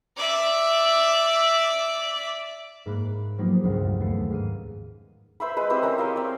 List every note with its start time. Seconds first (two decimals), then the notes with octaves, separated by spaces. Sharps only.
0.17 D5 E5
2.86 G#2 A#3 B5 F#6 D7
3.38 F3 F#3 A#3 B3 D#4 G4
3.63 E1 C#2 G2 B3 F5 F#5
4.00 D#2 A3 B3 C7 C#7
4.30 G#2 F5 D#7
5.40 B4 C5 E5 B5
5.56 G#3 B4
5.70 C4 E4 G4 C5
5.82 C#4 A#4 C5 E5
5.98 A#4 C#5 D#5 F5
6.16 C4 D5